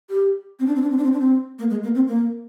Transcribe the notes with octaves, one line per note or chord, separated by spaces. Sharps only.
G4
C4
D4
C4
D4
C4
D4
C4
D4
C4
A#3
G#3
A#3
C4
A#3